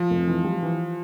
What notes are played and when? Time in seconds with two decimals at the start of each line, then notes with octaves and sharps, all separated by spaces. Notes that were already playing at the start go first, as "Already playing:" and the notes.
Already playing: F3
0.10 F1
0.27 E3
0.44 G3
0.63 E3